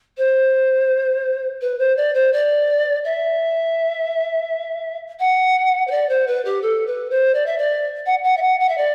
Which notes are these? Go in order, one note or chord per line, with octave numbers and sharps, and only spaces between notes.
C5
B4
C5
D5
C5
D5
E5
F#5
C5
D5
C5
B4
G4
A4
B4
C5
D5
E5
D5
F#5
F#5
E5
F#5
F#5
E5
D5